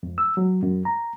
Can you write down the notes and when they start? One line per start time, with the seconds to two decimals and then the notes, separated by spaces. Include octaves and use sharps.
0.03 F2
0.18 E6
0.37 F#3
0.63 F#2
0.85 A#5